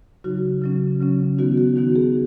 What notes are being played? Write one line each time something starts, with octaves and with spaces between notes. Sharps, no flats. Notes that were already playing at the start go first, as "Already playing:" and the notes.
C#3 F#3 D#4 F#4
C#3 F#3 C#4
C#3 F#3 C#4
D#3 B3 D#4 F#4
F#4
D#3 B3 D#4 F#4
G#4